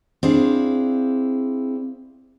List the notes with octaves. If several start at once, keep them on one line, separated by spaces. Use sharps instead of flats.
C4 D4 E4 G#4 F5